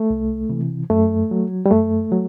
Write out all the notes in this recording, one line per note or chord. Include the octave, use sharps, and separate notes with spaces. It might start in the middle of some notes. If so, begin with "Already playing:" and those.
Already playing: A3
C2
C3 E3
F#2 A3
F#3
G3
F#2 A3
F#3